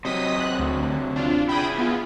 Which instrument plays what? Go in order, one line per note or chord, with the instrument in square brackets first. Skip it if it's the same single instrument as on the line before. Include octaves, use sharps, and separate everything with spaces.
[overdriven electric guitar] C3 F#3 [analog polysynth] D#5 D#6 B6
[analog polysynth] F#6
D2
D4 F4
[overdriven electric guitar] E4 G#4 [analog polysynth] G5 B5 D#6
[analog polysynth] B3 F4